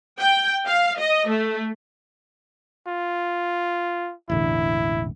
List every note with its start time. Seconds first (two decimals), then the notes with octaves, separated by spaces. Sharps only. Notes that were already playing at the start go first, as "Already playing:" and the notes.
0.19 G5
0.67 F5
0.98 D#5
1.28 A3
2.87 F4
4.29 E1 A1 D3 E4